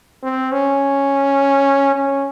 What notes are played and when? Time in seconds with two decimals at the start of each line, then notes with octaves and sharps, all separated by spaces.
0.23 C4
0.52 C#4
1.95 C#4